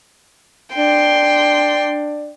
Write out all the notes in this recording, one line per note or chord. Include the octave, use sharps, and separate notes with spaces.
D4 D5 G5 C6